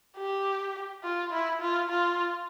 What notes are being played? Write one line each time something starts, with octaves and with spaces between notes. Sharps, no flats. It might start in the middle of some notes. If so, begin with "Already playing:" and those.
G4
F4
E4
F4
F4